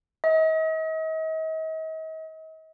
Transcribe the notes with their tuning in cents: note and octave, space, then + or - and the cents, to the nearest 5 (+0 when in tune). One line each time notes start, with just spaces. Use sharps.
D#5 +40